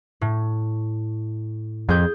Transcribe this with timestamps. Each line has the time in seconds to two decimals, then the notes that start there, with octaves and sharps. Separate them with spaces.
0.21 A2
1.89 F2 G#4 G6